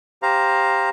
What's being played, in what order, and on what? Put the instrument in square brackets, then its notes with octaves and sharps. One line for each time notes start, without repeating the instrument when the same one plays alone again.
[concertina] G4 C5 F5 A#5